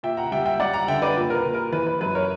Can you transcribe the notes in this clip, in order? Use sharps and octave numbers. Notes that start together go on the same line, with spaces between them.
A#2 E5 G5
F#5 A#5
G3 E5 G5
E5 G5
G3 D5 F#5
F#5 A#5
D3 E5 G5
B4 D5
A#2
A#4
B4
A#2
A#4
E3 B4
B4
F#2 B4
A#4 C#5